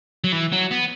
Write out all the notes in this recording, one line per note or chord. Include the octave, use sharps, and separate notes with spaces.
F#3
E3
F#3
B3